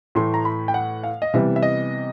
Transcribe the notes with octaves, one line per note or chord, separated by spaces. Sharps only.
A2 E3 A3 C6
A#5
B5
G5
F#5
F5
D#5
C3 E3 G3 B3 E5
E5
D#5